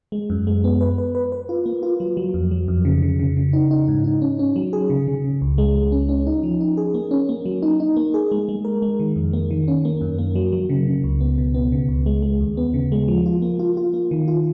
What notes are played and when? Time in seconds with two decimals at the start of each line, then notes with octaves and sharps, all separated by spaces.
0.12 G#3
0.30 F#2
0.47 G#3
0.64 B3
0.81 B4
0.98 B4
1.15 B4
1.32 B4
1.49 F4
1.66 A#3
1.83 F4
2.00 F#3
2.17 F#3
2.34 F2
2.51 F#3
2.68 F2
2.85 C#3
3.03 C#3
3.19 C#3
3.37 C#3
3.53 D#4
3.71 D#4
3.88 G#2
4.04 D#4
4.22 C#4
4.39 C#4
4.56 F#3
4.73 G#4
4.90 C#3
5.08 C#3
5.24 C#3
5.42 C#2
5.58 G#3
5.76 G#3
5.92 C#4
6.09 C#4
6.27 D#4
6.43 F3
6.61 D#4
6.77 G#4
6.94 A#3
7.11 C#4
7.29 A#3
7.45 F#3
7.62 D#4
7.80 D#4
7.96 A#3
8.14 G#4
8.32 G#3
8.49 G#3
8.65 A#4
8.82 G#3
9.00 D#3
9.16 F2
9.33 A#3
9.51 D#3
9.68 C#4
9.85 A#3
10.01 F#2
10.18 A#3
10.35 F#3
10.52 F#3
10.69 C#3
10.87 C#3
11.04 C#2
11.20 B3
11.38 B2
11.54 B3
11.72 C#3
11.88 C#2
12.06 G#3
12.22 G#3
12.40 D#2
12.57 B3
12.74 C#3
12.92 G#3
13.08 F3
13.26 F4
13.42 A#3
13.59 F4
13.77 F4
13.93 A#3
14.11 D#3
14.28 F4